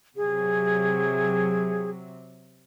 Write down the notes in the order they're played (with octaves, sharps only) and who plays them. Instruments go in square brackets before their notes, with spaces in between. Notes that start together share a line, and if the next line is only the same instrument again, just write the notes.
[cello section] C3 F#3 [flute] G#4